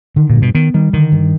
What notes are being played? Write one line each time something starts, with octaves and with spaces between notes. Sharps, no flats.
D3 D#3
A#2
G2
B2
D#3 B3
D#3 G3
D3 D#3
G2